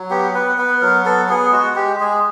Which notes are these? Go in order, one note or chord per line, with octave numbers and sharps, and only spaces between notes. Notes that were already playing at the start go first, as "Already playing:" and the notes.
Already playing: F#3
B3 G4
B3 B4
B3 B4
F#3 A#4
B3 A4
B3 G#4
G#3 F#4
G#3 G4
G#3 G#4